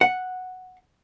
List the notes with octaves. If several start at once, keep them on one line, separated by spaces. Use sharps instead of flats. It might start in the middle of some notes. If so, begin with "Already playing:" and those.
F#5